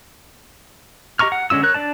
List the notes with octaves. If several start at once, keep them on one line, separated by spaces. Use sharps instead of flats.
G4 D#5 A#5 C#6 F6
F#5
D3 G#3 C#4 F4 E6
A#4 C#5 F#6
D4 D5 A5